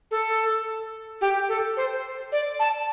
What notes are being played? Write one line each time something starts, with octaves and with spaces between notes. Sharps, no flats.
A4
G4
A4
C5
D5
A5